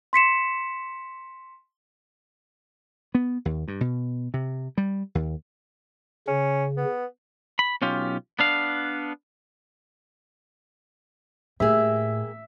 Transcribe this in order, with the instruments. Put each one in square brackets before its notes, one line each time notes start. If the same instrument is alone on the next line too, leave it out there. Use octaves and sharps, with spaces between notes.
[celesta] C6 B6 C#7 E7
[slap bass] B3
D#2
G2
B2
C3
G3
D#2
[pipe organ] C#3 [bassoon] C#4
[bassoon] B3
[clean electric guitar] B5
B1 C#4 F4 G4
B3 D4 F5
[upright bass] A2 [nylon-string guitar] A#3 G4 G#4 [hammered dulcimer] E5